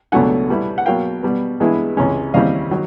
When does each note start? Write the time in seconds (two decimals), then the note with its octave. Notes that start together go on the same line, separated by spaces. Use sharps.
0.12 C#2 B2 F#3 A3 D4 F#5 G#5
0.49 B2 G3 B3 E4
0.78 F#5
0.86 B2 F#3 A#3 F5 G5
1.23 B2 G3 B3
1.60 G2 E3 G#3 B3 E4
1.97 C#2 C3 E3 G#3 C#4
2.34 D#2 C#3 E3 G3 C4 D#5 F5
2.71 D#3 F#3